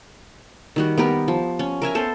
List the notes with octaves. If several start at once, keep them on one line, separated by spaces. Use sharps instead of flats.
D#3 G3 F#4
B3 G4 A#4
F3
C#4
A#4 E5 G#5 A#5
B3 A4 C5